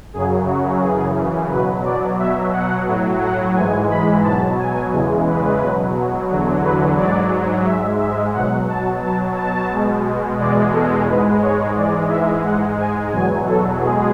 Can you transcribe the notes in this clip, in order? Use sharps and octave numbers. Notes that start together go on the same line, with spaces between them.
F#2 C#3 F#3 G#4
F#4
F#2 C#3 E3 G#4
B2 F#3 B4
D5
B2 F#3 E5
F#5
A2 F#3
F#5
G#2 E3 G#3 G#5
B5
B2 F#3 A5
G#5
E2 C#3 E3 G#3
B4
B2 F#3
E2 D3 F#3
B4
G#2 F#3 D5
G#2 G#3 E5
E5
B2 F#3 F#5
A5
B2 F#3 A5
A5
B2 G#3
E2 B2 G#3 D5
A4
G#2 G#3 B4
C#5
G#2 E3 G#3 D5
E5
G#2 G#3 F#5
G#5
E2 B2 F#3 G#5
A4
B2 G#3 G#4